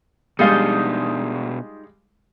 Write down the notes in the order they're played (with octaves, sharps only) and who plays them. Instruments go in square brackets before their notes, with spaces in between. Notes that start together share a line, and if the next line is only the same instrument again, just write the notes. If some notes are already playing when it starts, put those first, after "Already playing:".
[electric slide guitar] B2 D4 [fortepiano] G3 G#3 F5 [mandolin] D#4 F4 D#5